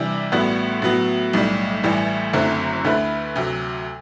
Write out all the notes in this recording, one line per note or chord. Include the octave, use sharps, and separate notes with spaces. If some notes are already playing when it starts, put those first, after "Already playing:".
Already playing: C3 E3 G3 D4
A1 A2 G3 B3 F#4
A2 F#3 B3
B1 A2 G3
A1 A2 E3 G3
F#1 F#2 D3 A3 C4
D2 D3 A3 E4 B4
D2 C3 F#3